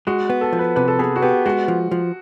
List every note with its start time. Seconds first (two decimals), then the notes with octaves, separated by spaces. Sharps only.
0.07 G#3 F#4
0.30 B3
0.41 A4
0.53 F3
0.59 B4
0.76 C3 B4
0.88 A4
0.99 B3 G#4
1.16 F#4
1.22 B3 G4
1.46 G#3 F#4
1.68 F3
1.91 F3